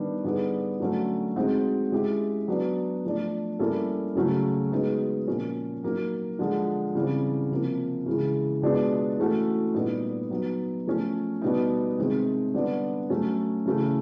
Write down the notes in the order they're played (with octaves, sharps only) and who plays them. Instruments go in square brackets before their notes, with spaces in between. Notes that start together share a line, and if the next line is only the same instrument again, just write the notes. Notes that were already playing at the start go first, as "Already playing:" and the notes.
Already playing: [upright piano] D#3 G3 B3 D4
D3 G3 B3 D#4 G#4
D3 F#3 A3 C#4
G#3 C4 D#4 F#4
G#3 C#4 E4 G4
F#3 B3 D4
F3 A3 D4
G3 A#3 C#4 E4 A4
C#3 F#3 A3 C#4 F#4
G#3 B3 D#4 F#4
A#2 F3 A#3 C#4
F#3 A#3 D#4
D3 F3 G#3
C#3 E3 G3 C4
C3 F3 A#3
C#3 E3 G#3
B2 G#3 B3 D4 F4
E3 A3 C#4 F#4 A4
A#2 G3 B3 D#4
F#3 B3 D#4
F3 A3 C#4
B2 G3 B3 D#4
C3 D#3 G#3 C4
D3 G3 B3 D4
F#3 A3 C#4
C#3 E3 A3 C#4